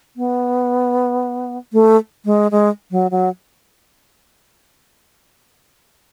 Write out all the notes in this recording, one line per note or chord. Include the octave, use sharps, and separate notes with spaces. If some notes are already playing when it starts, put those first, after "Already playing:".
B3
A3
G#3
G#3
F#3
F#3